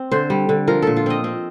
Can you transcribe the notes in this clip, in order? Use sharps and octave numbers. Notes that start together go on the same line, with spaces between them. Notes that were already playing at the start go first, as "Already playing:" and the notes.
Already playing: C4
D3 C5
G3
D3
F3 A#4
A#2 A4
F4
C4 D#5
C4